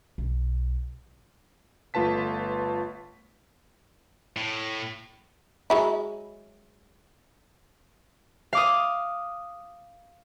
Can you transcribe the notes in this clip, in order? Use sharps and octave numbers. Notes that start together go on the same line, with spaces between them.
B1
G1 A3 F4 B4 A5 B6
A2
F#3 G#3 E4
F5 D6 D#6